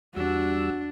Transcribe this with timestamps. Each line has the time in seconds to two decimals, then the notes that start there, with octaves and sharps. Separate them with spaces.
0.16 E2 G3 D4 F#4 E6